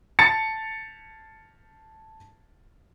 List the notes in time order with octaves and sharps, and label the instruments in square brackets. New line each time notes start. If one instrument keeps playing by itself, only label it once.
[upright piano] A5 A6 C#7